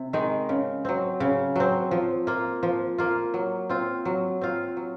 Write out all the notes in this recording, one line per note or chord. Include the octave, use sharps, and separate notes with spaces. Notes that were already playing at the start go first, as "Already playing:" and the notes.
Already playing: C3
D#3 G#3 D#4
C#3
F#3 C4
C#3
F#3 C4
F3
A#3 F4
F3
A#3 F4
F#3
C4 F4
F#3
C4 F4
F#3